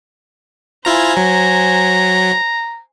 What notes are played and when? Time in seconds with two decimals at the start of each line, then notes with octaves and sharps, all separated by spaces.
0.85 E4 F4 C5 G#5 A#5
1.17 F#3 A#5